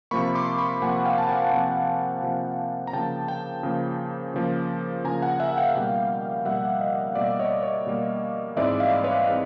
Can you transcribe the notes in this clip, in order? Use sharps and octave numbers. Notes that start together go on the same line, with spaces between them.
C3 F3 A#3 B5 C#6
C6 D6
B5 C#6
C3 F3 A#3 F#5 G#5
F5 G5
A5
F#5 G#5
C3 F3 A#3
C3 F3 A#3
A#5
C#3 F3 A#3 G5 A5
G5 A5
C#3 F3 A#3
C#3 F3 A#3
C#3 F3 A#3 G#5 A#5
F#5 G#5
E5 F#5
F5 G5
B2 G3 A#3
B2 G3 A#3 E5 F#5
D#5 F5
B2 G3 A#3 D5 E5
C#5 D#5
C#5 D#5
B2 G3 A#3
G#2 E3 G#3 C4 D5 E5
D#5 F5
B4 C#5
E3 G#3 C4